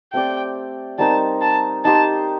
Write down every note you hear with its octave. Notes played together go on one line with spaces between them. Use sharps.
A3 C4 G4 D5 G5
G3 C4 D#4 A#4 A5
A5
D#4 G4 C5 A5